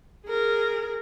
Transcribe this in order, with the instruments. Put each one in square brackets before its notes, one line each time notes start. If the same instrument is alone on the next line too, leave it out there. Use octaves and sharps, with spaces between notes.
[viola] G#4 A#4